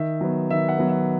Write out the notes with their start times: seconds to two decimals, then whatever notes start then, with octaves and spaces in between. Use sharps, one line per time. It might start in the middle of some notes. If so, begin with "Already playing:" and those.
Already playing: D#3 E5
0.21 F#3 B3
0.50 D#3 E5
0.69 F#5
0.78 F#3 B3
0.89 E5